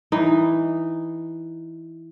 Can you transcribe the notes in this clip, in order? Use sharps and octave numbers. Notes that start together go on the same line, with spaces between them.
E3 D#4